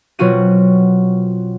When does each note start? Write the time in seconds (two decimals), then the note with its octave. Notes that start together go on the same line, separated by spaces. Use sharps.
0.19 B2 F#3 C4 F4 F#4 D#7